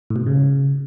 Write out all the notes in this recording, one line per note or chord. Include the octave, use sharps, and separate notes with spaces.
A2
B2
G#2
C#3